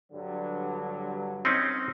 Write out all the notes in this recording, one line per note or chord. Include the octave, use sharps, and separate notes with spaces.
G2 D3 F#3
C4 C#4 D#4